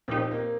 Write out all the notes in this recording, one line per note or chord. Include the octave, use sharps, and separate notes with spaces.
A#2 F3 C4 D#4 G4
A#3